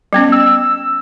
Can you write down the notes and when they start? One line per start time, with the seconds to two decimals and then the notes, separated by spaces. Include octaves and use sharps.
0.13 G3 B3 C#4
0.32 E6